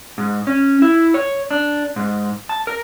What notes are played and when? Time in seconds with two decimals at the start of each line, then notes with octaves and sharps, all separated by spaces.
0.18 G#2
0.47 C#4
0.82 E4
1.14 C#5
1.51 D4
1.96 G#2
2.49 A5
2.67 A#4